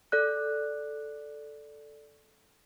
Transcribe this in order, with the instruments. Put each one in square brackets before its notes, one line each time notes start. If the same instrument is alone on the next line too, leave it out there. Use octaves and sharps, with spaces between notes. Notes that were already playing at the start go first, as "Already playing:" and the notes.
[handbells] A4 D5 F#6